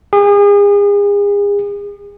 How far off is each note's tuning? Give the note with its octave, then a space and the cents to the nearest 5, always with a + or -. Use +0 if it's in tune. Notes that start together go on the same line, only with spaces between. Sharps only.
G#4 -40